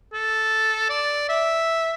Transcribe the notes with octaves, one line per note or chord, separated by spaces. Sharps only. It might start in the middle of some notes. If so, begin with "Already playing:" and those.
A4
D5
E5